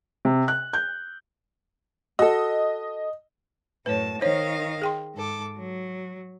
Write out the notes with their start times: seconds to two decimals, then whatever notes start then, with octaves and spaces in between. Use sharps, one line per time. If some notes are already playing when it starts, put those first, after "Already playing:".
0.25 C3
0.48 F#6
0.73 G6
2.19 F#4 A4 D#5
3.86 F#2 A2 B4 C#5 A5
4.21 D#3 C5 C#5 D#5 F5
4.82 G#4 G5 C6
5.15 G#2 A4 D6
5.58 F#3